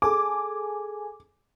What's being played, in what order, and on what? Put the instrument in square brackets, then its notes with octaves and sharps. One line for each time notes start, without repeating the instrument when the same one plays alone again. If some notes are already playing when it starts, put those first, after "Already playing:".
[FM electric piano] G#4 A4 G#5 [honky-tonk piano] D6